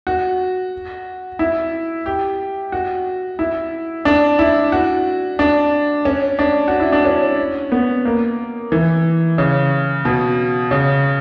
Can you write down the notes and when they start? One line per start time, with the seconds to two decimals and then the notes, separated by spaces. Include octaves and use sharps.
0.07 F#4
1.39 E4
2.06 G4
2.72 F#4
3.39 E4
4.05 D4
4.39 E4
4.72 F#4
5.39 D4
6.05 C#4
6.39 D4
6.68 F#4
6.80 E4
6.92 D4
7.05 C#4
7.72 B3
8.05 A#3
8.72 E3
9.38 C#3
10.05 B2
10.71 C#3